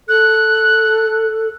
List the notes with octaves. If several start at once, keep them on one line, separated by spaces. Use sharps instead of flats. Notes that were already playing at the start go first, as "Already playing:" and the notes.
A4 F#6